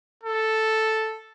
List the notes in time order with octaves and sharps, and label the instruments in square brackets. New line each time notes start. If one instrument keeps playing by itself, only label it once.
[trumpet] A4